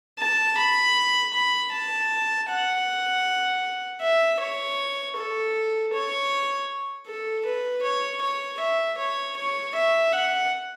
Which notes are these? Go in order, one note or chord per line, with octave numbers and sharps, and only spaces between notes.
A5
B5
B5
A5
F#5
E5
C#5
A4
C#5
A4
B4
C#5
C#5
E5
C#5
C#5
E5
F#5